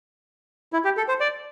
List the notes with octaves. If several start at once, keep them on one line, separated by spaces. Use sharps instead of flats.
E4
G4
A4
C5
D5